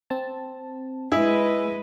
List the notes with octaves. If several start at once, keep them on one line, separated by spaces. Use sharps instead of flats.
C4 A5
G#3 E4 G#4 B4 D#5 B5